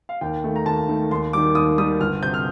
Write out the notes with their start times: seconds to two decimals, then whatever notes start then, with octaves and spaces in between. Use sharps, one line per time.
0.09 F5
0.21 D#2 G5
0.44 D#3 A3
0.56 A#5
0.66 D#2 A5
0.88 D#3 A3
1.11 D#2 C6
1.33 D#3 G3 D6
1.55 D#2 D#6
1.78 D#3 G3 D#6
2.00 G1 F6
2.22 C3 G6
2.34 F6